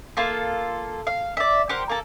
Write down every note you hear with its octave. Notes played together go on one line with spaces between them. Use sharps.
A#3 F4 A4
F5
D5 E5
G4 A#4 C5 F#5
A#3 A4